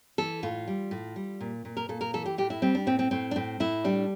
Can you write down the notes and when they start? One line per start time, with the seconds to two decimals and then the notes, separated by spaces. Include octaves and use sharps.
0.18 E3 A4
0.43 A2 F4
0.68 G3
0.91 A2
1.16 G3
1.41 A#2
1.65 A#2
1.77 A#4
1.89 A#2 A4
2.01 A#4
2.14 E3 A4
2.26 G4
2.38 A2 G4
2.50 E4
2.62 G3 C4
2.75 D4
2.87 A2 C4
2.99 C4
3.11 A2 C4
3.31 D4
3.36 A2 C4
3.60 A2 E4
3.84 G3 D4